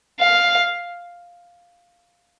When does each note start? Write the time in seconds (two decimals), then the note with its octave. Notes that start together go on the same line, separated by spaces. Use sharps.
0.20 F5